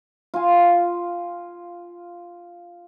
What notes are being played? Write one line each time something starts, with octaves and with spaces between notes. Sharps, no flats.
F4 G#5